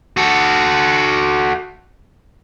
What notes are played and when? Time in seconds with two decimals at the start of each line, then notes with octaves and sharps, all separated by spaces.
0.17 F#4 A4